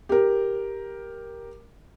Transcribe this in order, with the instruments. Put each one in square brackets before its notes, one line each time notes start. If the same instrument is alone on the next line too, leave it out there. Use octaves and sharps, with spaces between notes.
[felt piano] G4 A#4